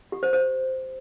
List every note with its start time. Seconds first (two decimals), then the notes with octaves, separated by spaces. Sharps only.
0.12 G4
0.23 C5
0.33 C5